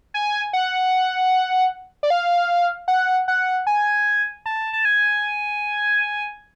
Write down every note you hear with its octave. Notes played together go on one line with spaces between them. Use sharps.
G#5
F#5
D5
F5
F#5
F#5
G#5
A5
A5
G#5